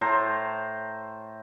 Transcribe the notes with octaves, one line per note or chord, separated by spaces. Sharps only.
A2 A4 C5 A#5